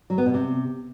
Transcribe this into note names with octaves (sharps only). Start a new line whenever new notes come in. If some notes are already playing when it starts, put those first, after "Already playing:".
F#3
B3
B2
C3